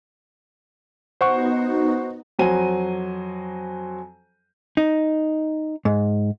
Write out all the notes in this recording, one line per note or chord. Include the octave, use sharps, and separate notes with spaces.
B3 D#4 F#4 C5 F#5 C#6
F2 F#3 F#4 C5 G#5 D#7
D#4
G#2